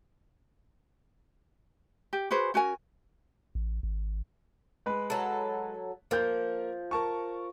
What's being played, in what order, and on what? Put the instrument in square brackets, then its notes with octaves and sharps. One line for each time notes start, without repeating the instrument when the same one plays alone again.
[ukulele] G4
F#4 G#4 B4 C5
C#4 F#4 A#4 G#5
[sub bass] A1
G#1
[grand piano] G#3 B4 B5
[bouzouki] F#3 A4
[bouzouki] F3 [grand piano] A#3 A#4 G6
[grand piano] A#4 A5 C#6